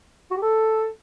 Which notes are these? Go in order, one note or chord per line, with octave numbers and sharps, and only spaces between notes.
F#4
G4
A4